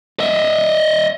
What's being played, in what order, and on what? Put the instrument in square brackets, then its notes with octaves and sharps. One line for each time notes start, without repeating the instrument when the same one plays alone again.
[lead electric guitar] D#5 E5